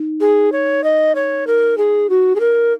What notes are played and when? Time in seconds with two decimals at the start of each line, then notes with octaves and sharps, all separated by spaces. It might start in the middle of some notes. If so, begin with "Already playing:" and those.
Already playing: D#4
0.20 G#4
0.52 C#5
0.84 D#5
1.15 C#5
1.47 A#4
1.77 G#4
2.09 F#4
2.35 G#4
2.40 A#4